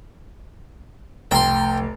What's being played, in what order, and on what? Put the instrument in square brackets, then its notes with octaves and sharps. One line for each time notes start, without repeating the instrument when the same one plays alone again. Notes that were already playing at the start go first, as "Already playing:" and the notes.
[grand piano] F1 [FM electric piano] C2 A3 A#5 [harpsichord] G5 C6